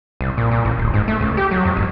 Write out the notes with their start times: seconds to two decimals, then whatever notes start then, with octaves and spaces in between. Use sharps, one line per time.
0.21 C2
0.37 A#2
0.51 A#2
0.65 A1
0.78 D1
0.94 G#2
1.08 A3
1.21 C#2
1.37 G4
1.51 F#3
1.65 F2
1.77 G#1